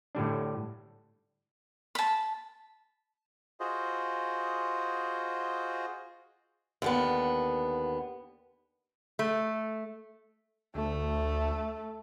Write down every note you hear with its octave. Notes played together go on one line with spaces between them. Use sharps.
A2 D3 G3 D4
A5 B5
F4 F#4 G#4 C5 D#5
D#2 D3 B3
A3
D2 A3